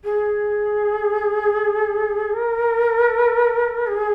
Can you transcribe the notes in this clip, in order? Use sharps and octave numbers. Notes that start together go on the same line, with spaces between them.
G#4
A#4
G#4